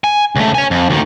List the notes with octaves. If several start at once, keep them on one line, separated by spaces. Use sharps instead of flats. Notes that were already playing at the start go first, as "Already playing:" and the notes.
G#5
C#2 A3
C#5 G#5
F2
D2 D#3